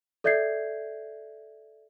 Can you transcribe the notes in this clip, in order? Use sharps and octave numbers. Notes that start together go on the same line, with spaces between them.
A4 D5 E5 G6 G#6 C7